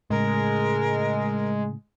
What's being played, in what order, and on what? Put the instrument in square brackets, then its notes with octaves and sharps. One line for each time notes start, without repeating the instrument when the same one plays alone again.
[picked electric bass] A2 C#3 [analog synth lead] G#3 [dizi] A#4